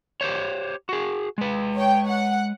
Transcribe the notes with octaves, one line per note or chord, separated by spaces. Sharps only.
G4 C5 C#5
F#4 G#4
G#3 B4
C#5 G5
F#5